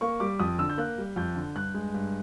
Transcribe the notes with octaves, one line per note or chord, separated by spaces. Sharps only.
A#3 C#6
G3 D6
F2 D#6
D3 E6
G6
A#3 F#6
G3
F2 G6
D3
G2 F#6
G#3
G2